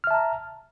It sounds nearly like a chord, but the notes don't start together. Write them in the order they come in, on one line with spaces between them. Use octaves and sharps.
F6 E5 A5 A#5